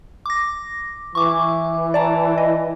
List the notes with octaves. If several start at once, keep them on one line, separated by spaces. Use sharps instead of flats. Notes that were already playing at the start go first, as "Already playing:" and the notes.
D6 A#6
E3 C#6 D6
D5 A5 A#5
D#5